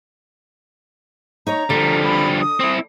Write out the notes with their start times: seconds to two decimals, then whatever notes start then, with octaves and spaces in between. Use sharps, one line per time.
1.47 D#4 C#5 A#5
1.70 D3 F3 G3
2.04 B5
2.41 D#6
2.60 C4 E4